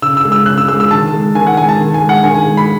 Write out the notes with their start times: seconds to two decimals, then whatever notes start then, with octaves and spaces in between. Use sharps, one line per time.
0.02 C#3 E6
0.17 E6
0.24 G#3
0.32 E6
0.46 C#3 F#6
0.58 E6
0.68 G#3 E6
0.80 E6
0.91 D#3 A5
1.13 G#3
1.35 D#3 G#5
1.47 F#5
1.57 G#3 G#5
1.69 A5
1.79 D#3
1.94 G#5
2.02 G#3
2.09 F#5
2.24 D#3 G#5
2.35 G#5
2.46 G#3
2.57 B5